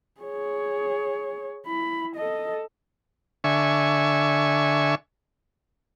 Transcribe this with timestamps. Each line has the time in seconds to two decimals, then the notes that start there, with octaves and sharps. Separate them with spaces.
0.21 G#4 C#5
1.67 E4 B5
2.15 A4 D#5
3.44 D3 E5 G#5 C#6